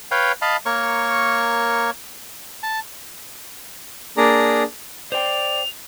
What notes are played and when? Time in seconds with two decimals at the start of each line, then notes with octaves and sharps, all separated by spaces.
0.11 B4 C#5 F5 G5
0.42 D#5 F5 A5 B5
0.66 A#3 A#4 C#5 C#6
2.63 A5
4.17 A#3 D4 G#4 D5 A#5
5.12 C5 D5 G5 F7